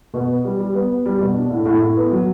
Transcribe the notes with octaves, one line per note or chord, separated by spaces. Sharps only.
B2
B3
G3
G3
B3
B3
G3
B2
D4
A2
A2
A2
B3
F#3